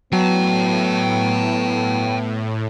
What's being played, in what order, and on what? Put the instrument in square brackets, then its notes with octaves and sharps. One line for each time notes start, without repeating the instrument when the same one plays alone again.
[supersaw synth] A2 [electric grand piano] F#3 [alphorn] B3 [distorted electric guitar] G5 A5